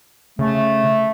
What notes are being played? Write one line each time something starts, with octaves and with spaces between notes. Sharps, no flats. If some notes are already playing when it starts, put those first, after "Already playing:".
C#3 A3